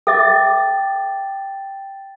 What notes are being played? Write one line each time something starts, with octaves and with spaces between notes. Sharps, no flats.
A4 E5 G5 D6 A6